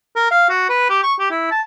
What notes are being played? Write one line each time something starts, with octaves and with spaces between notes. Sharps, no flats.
A#4
F5
F#4
B4
G4
C#6
G4
E4
A5